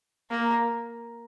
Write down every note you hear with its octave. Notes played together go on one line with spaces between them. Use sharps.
A#3